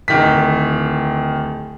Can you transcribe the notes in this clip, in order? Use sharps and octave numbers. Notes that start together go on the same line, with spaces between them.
D1 D#3 B6